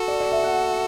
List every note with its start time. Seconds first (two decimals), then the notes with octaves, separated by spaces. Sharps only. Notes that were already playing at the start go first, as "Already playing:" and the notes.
Already playing: F#4 A4
0.08 D5
0.20 D5
0.32 E5
0.44 F#5